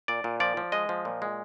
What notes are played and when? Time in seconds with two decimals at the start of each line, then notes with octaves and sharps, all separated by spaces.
0.08 A#2 D5
0.24 A#2
0.40 F3 D5
0.57 F3
0.72 G#3 D#5
0.89 F3
1.05 A#2
1.22 G#3